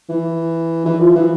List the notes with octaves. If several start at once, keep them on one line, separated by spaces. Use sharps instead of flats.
E3
E3
F3
E3